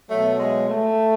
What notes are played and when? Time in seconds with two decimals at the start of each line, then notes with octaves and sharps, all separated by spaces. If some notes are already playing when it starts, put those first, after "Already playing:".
0.10 B2 F#3 A3
0.39 G#3
0.69 A3